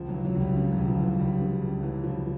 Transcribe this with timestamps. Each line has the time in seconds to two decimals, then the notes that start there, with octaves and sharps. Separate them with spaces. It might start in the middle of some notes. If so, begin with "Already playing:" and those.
Already playing: C#2 F3
0.09 F#3
0.14 E3
0.25 F#3
0.35 C#2
0.41 G3
0.56 C#3 G3
0.72 F#3
0.78 C#2
0.88 F3
0.98 E3
1.04 F#3
1.19 C#2 G3
1.41 C#3
1.62 C#2
1.83 E3 F#3
2.04 C#2 F3